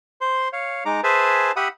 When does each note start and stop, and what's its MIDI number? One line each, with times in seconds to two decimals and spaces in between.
0.21 0.49 72
0.21 0.49 84
0.53 0.84 73
0.53 0.84 77
0.85 1.01 56
0.85 1.01 63
0.85 1.01 82
0.85 1.01 86
1.04 1.52 68
1.04 1.52 71
1.04 1.52 72
1.04 1.52 76
1.04 1.52 80
1.04 1.52 81
1.56 1.68 67
1.56 1.68 76
1.56 1.68 78
1.56 1.68 83
1.56 1.68 87